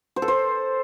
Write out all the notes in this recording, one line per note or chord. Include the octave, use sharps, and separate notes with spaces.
C5
A4
C5